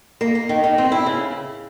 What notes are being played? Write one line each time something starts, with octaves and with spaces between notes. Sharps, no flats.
A#3
A#3
D#3
D#3
C4
E4
C#3